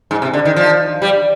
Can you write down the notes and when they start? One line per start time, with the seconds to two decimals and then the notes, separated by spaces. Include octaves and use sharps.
0.11 G#2
0.22 C3
0.34 D3
0.45 D#3
0.56 F3
1.02 G3